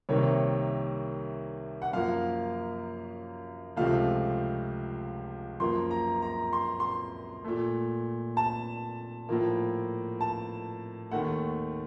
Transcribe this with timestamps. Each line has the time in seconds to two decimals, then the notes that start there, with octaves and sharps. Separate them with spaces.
0.09 C2 C3 D#3 A#3 C#5
1.82 F#5
1.93 F#2 F3 A#3 F5
3.76 C#2 C3 F3 A3 F5
5.60 F#2 F3 A#3 C6
5.91 A#5
6.22 A#5
6.53 C6
6.80 C6
7.44 A#2 A3
8.37 A5
9.29 A2 F3 A#3
10.21 A5
11.11 D#2 D#3 A3 F#5